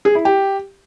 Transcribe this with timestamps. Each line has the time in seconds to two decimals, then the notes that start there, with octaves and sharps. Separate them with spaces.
0.05 G#4
0.15 E4
0.25 G4